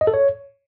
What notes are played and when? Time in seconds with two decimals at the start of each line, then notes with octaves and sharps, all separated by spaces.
0.01 D#5
0.07 A4
0.14 C#5